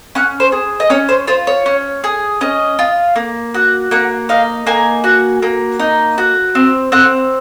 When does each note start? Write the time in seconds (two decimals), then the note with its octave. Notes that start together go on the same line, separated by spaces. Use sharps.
0.15 C#4 F#5
0.40 C5
0.52 G#4
0.80 D#5
0.90 C#4 C#5
1.09 C5
1.27 F4 C5
1.47 C#5
1.66 C#4
2.04 G#4
2.41 C#4 D#5
2.79 F4
3.16 A#3
3.54 F#4
3.91 A#3 F#5
4.29 D#4 F5
4.67 A#3 G#5
5.04 F#4
5.43 A#3
5.80 D#4
6.18 F#4
6.55 C4
6.92 C4 F#5